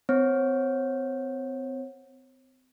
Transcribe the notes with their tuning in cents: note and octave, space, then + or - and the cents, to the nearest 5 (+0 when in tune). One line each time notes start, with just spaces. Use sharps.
C4 -35 C#5 -35